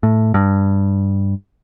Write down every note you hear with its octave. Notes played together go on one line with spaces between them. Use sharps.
A2
G2